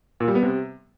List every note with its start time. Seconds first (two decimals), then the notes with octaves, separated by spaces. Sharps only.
0.20 A#2
0.28 G3
0.35 B3
0.43 C3